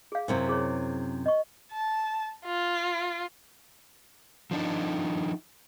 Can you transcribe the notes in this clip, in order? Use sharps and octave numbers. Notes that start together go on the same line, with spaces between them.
G#4 F5
F#2 C3 E4
G#4 C#5
D#5 C#6
A5
F4
F3 D4 D#4